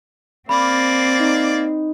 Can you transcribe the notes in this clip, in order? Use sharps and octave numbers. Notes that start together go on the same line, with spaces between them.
A#3 C4 D5 B5
D#4